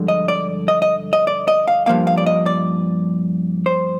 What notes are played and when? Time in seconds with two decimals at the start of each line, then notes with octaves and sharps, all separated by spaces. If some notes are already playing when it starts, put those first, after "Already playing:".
Already playing: G2 D3 F3 G#3 D4
0.08 D#5
0.28 D5
0.68 D#5
0.82 D#5
1.13 D#5
1.27 D5
1.48 D#5
1.68 F5
1.86 G2 F3 A#3 F5
2.07 F5
2.18 D5
2.26 D#5
2.46 D5
3.66 C5